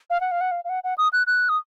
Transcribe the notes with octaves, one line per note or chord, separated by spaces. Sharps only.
F5
F#5
F5
F#5
F5
F5
F#5
F#5
D#6
F#6
F#6
D#6